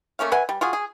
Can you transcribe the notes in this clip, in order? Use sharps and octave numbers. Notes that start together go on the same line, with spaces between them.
A3 A#3 C#4 F5
B4 E5 F#5 G#5
G3
F4 F#4 G#4
G#4